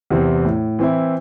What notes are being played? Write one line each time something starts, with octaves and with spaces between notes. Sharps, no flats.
E2 C3 E3 C4
A2
E3 C4 E4